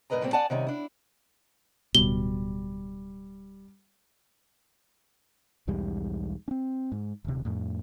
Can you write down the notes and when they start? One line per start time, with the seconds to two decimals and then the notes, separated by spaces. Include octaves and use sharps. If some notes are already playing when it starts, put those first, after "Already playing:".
0.10 G2 A#2 A#4 B4 D#5 A#5
0.22 A#2 G3 A3 A#3 C4
0.33 D5 F#5 G#5 A5
0.50 C3 D#3 G3 C#4
0.67 D4 E4
1.95 D1 B2 G3 G7
5.67 B1 E2 G#2 G3
6.48 C4 C#4
6.92 G#2
7.25 D#1 C3
7.45 F2 A2